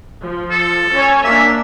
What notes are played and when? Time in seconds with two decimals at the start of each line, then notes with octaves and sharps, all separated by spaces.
0.20 F3
0.51 A4
0.91 C#4 C#5 G#5
1.25 A#3 D4 E5